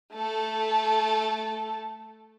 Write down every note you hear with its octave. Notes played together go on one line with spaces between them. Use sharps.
A3 A4